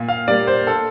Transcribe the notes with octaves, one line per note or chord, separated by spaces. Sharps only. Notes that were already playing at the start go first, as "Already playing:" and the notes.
Already playing: A#2
F5
G3 A#3 D5
C5
A4